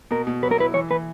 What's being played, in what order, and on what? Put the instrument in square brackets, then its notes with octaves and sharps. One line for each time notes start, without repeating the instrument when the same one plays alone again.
[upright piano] B2 [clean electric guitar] A#4
[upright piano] B2
[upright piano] F#3 [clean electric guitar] B4
[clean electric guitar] A#4
[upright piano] E4 [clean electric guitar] B4
[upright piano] E3 [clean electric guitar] C#5
[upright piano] E3 [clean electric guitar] B4